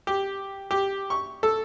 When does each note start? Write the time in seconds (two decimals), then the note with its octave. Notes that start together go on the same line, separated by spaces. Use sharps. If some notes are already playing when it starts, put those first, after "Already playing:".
0.07 G4
0.71 G4
1.10 C#6
1.43 A4